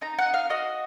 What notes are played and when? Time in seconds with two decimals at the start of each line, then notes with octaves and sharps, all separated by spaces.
0.01 D#4 A#5
0.19 F#5
0.25 D#4
0.34 F5
0.50 F#4 D#5